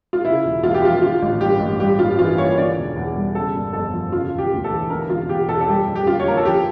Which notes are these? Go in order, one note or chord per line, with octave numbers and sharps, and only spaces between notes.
F4
C#3 E4
E1
E2 F4
G4
F3 F4
D3 F4
A1
G2 G4
A1
G3 G4
G2 F4
E3 F4
A#3 C#5
D3 D5
E1
E2
G3
C#3 A4
G1
F2 A4
F3
C#3 F4
E1
G4
D2
A4
E3
D3 A#4
E1 F4
E2 G4
E1 A4
A4
G3 G4
F2
G4
D3 F4
C#5
A#3 A#4
A4
F3 G4